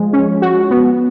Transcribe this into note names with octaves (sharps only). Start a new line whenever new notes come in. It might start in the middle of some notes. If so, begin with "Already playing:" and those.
Already playing: F3 G#3
C#4
F#4
B3